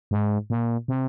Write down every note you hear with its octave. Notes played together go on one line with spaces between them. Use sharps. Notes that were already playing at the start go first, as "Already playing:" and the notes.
G#2
A#2
C3